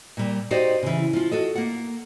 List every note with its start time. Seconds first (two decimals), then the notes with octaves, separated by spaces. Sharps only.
0.17 A#2 G3
0.51 D#4 F#4 G4 C5 D5 D#5
0.83 C#3 E3
1.13 F3 F4
1.32 F#4 A4 D#5
1.55 A#3 F#5